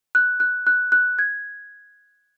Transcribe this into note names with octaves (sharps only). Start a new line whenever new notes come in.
F#6
F#6
F#6
F#6
G#6